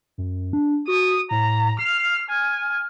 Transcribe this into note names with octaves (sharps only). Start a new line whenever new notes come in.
F#2
D4
F#4 D#6
A2 A#5
F6 C7
G#5 F6